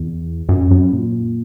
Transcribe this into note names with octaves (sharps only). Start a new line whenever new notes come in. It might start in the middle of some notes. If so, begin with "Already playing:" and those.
Already playing: E2
F#2
F#2
A#2